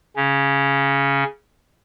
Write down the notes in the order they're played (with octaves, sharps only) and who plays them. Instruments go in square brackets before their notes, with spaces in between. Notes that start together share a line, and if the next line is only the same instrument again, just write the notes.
[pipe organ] C#3 C#4